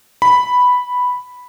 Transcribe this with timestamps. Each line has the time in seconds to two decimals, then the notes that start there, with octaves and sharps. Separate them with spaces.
0.22 B5